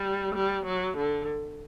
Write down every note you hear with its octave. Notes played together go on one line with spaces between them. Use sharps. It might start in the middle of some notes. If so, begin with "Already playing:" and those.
Already playing: G3
G3
F#3
D3